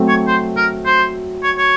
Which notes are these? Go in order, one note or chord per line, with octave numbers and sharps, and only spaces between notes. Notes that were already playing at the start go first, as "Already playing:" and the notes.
Already playing: F#3 A3 C4
C#5
C5
A#4
C5
C#5
C#5